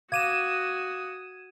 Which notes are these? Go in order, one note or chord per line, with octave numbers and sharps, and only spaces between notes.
F#4 F5 D6 D#6 G#6 D#7 E7